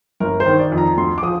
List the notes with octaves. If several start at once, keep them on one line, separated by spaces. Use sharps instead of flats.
G1 A#4
C5
D#3
D5
F2
A#5
D2 C6
D6
F3 D#6